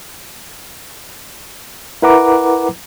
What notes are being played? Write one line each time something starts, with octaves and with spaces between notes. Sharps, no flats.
E4 A#4 B4 F#5 A#5 D6